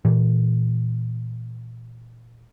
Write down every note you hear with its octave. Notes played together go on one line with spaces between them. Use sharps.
A#2 E3